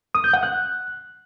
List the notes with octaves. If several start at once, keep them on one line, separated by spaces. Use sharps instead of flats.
D#6
G6
F#5
F#6